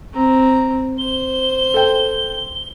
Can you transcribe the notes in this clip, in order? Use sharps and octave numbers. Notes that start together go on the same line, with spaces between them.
C4 A#5
C5 G7
A4 G5